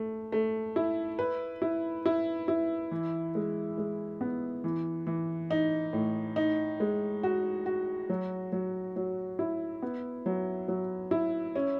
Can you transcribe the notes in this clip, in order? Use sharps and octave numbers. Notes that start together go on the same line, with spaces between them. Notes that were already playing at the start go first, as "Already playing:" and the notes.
Already playing: A3
A3
E4
B4
E4
E4
E4
E3
G#3
G#3
B3
E3
E3
D#4
A2
D#4
G#3
F#4
F#4
F#3
F#3
F#3
E4
B3
F#3
F#3
E4
C#4